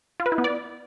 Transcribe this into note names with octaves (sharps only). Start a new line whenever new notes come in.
F4
B4
E4
B3
D5